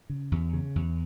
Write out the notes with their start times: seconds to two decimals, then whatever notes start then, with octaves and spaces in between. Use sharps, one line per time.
0.09 C#3
0.32 E2
0.53 C#3
0.75 E2